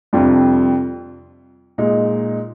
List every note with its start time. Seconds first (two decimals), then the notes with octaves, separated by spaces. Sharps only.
0.13 F2 C3 G3 D4 F4
1.78 A#2 G#3 D#4